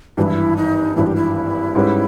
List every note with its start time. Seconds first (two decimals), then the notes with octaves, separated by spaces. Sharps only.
0.17 G#1 G2 E3 E4 G4
0.57 D#4
0.96 G#1 G2 E3 E4
1.07 G4
1.16 E4
1.75 G#2 G3 C#4 G4 B4